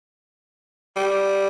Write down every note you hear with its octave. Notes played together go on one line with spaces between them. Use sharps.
G3